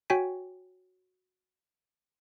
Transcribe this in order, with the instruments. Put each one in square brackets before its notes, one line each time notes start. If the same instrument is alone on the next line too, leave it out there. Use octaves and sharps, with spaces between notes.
[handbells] F#4 C#5 G5 G#5 B6